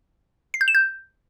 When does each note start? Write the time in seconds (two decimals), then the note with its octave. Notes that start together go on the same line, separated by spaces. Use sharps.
0.54 C7
0.61 G6
0.68 E7
0.75 G6